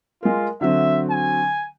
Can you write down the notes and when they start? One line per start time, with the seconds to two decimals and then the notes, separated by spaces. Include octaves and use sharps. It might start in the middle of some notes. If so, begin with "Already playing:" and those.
0.23 G#3 F4 A#4
0.61 D3 F#3 C4 E5
1.10 G#5